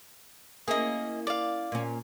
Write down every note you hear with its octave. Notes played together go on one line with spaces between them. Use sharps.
A#3 C#4 E4 G#4 D#5
D5 F5
A#2 C#4